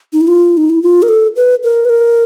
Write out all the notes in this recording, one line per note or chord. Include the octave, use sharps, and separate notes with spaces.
D#4
E4
F4
D#4
E4
F4
A#4
A4
B4
A#4
B4
A#4